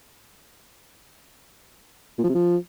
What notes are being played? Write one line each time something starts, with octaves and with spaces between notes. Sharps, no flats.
A#2
F3
C3
F3